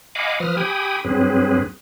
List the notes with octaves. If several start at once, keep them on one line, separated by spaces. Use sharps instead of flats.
D#5 F5 F#5 G#5 B5 D6
F3 B4 D#6 F6
G4 G5 G#5 B5 D#6
G2 F#3 C4 G#4 B4